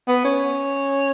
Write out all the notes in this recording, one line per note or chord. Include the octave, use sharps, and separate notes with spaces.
B3
C#4